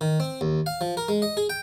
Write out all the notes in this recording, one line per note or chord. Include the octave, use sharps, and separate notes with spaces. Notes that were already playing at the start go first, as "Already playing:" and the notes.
D#3
C4
D#2
F5
F3
A#4
G#3
D#5
G#4
G5